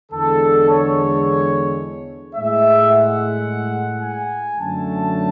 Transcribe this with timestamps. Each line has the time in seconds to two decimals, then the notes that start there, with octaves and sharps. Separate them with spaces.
0.12 E2 D3 G#3 A4
0.68 C#5
2.35 A2 G#3 E5
2.91 F#5
4.02 G#5
4.58 F#2 D3 F#3 A3 A5